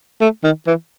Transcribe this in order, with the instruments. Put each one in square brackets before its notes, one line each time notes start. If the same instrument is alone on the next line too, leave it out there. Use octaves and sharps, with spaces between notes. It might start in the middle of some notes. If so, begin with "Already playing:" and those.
[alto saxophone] A3
D#3
E3